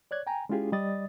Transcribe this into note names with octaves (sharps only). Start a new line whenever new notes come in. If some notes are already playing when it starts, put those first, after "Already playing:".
C#5 D5 F#6 G#6
G5 G#5 A#5
G#3 C#4 E4 F4 G4 G#4
G3 D5 D#5 D#6 A6